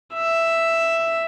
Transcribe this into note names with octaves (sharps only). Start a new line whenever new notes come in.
E5